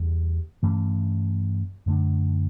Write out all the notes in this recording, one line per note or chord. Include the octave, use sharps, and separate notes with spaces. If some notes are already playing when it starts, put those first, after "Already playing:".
Already playing: E2 C#3 G3
G2 E3 A3 C#4
F#2 D3 A3 D4